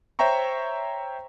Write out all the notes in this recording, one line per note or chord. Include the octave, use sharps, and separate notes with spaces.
C5 C#5 E5 G5 A#5 C#6